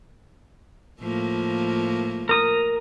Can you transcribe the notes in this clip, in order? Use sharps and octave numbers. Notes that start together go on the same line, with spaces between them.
A2 F3 A#3
A#4 D#6